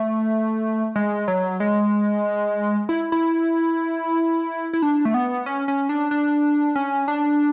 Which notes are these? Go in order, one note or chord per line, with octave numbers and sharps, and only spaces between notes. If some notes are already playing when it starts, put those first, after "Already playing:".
Already playing: A3
G#3
F#3
G#3
E4
E4
E4
D4
A3
B3
C#4
C#4
D4
D4
C#4
D4